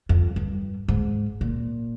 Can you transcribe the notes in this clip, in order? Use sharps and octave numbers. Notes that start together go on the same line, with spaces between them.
F2
G2
G#2
A#2